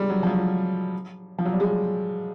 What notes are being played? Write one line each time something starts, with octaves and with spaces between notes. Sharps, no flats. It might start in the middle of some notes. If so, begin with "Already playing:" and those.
Already playing: G3 G#3
F#3
F3
F#3
F3
F#3
G3
G#3